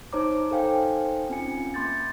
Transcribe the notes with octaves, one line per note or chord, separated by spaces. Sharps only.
D#4 C5 C#5 A#5 D6
D#4 A4 C5 F5 G5 G#5
C4 C#4 F4 G#5 C#7
A#3 B5 C6 D6 G6 A6